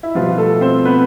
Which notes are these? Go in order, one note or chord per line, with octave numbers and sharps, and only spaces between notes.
E4
B2 F3 G3 B3 F4
A3 A4
C4 C5
B3 B4